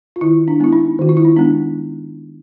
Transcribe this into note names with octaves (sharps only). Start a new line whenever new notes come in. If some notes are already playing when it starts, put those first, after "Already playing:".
F4
D#3 E4
D4
G#3 B3 D4 E4
D#4
D#3 F#4
F4
E4
D#4
G#3 B3 D4